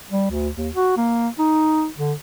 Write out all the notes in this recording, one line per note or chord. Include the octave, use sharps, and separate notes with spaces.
G3
D2
D#2
F#4
A#3
D#4
D3